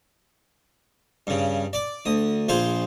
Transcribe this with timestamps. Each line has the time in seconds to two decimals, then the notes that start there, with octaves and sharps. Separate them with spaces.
1.27 G2 C#3
1.73 D5 D6
2.05 D2 D#6
2.49 A#1 F4 G#4 C5 C6